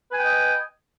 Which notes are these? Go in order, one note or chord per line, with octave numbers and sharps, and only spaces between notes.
B4 D#5 G5 G#5